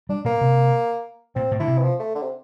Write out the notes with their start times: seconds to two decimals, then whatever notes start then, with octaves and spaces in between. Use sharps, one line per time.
0.09 G3 D4
0.25 A#2 A#3
0.41 C3
1.35 A#2 C4
1.51 A2
1.60 D3 E4
1.68 C3
1.78 E3
1.83 F3
1.99 A3
2.15 D3
2.22 C3